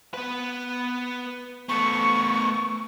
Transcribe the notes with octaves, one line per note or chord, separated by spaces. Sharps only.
B3 B4
A3 B3 C#6